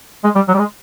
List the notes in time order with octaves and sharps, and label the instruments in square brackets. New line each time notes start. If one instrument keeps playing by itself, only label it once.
[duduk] G#3
G3
F#3
G3
G#3